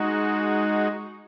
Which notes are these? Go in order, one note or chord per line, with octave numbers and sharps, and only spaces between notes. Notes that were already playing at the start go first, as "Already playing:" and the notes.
Already playing: G#3 D#4 F#4